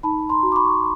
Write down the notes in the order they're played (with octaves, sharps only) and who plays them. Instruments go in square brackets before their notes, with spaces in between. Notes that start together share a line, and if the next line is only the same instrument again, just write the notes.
[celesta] D#4 A5 B5
A#5 C6
F#4
D6
B5 C#6